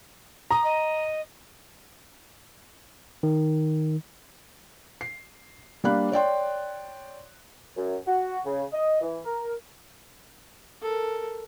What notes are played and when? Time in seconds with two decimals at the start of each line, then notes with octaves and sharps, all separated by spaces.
0.51 A#5 D#6
0.64 D#5
3.23 D#3
5.01 C7
5.84 G3 A#3 D4 F5 B5 F#6
6.12 C#5 D5 G5 C6
7.77 F#2
8.07 F#4
8.45 C#3
8.73 D#5
9.01 E3
9.24 A#4
10.82 A4 A#4